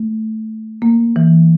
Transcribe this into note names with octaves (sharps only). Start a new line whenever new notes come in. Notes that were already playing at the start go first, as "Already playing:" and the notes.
Already playing: A3
A#3
E3